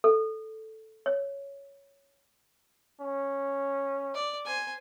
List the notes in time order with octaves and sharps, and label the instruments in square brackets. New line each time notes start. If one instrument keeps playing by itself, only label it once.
[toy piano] A4
C#5
[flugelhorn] C#4
[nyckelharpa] D5
C5 G#5